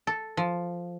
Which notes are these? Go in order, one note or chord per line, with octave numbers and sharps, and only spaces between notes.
A4
F3